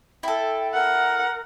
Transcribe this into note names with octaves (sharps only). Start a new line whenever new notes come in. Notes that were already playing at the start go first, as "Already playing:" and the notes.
E4 A4 G5
A#4 F#5